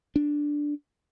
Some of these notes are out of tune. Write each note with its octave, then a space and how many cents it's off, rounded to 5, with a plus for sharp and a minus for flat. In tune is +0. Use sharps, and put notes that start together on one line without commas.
D4 +0